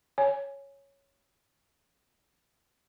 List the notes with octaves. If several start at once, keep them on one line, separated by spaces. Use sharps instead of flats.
C#5 G#5